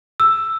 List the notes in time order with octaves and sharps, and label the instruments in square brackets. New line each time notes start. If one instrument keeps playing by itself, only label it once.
[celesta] E6